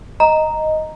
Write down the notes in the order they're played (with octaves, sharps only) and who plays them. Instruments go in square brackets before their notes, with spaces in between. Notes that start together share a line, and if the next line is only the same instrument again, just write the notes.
[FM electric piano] D#5 [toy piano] A#5